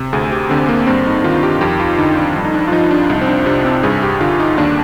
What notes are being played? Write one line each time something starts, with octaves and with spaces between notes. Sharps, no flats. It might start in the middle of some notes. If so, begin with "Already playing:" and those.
Already playing: C3
D2 G#4
G4
D3 C4
A#3
G2 C4
D#4
D#3 F4
G4
F2 G4
F4
D3 D#4
D4
G2
D#4
D4
F4
F3 D#4
D4
C2 D#4
C4
D4
C3 D4
C4
G2 G#4
G4
D3 F4
D#4
D#2 D4